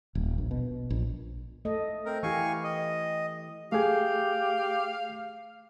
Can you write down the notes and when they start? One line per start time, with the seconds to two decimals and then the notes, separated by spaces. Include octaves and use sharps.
0.15 D#1
0.38 A#1
0.51 B2
0.90 A#1
1.65 A3 A4 D#5
2.06 C4 A#4
2.23 E3 E4 G4 F5 G#5 C#6
2.64 D#5
3.72 A3 G4 G#4 F5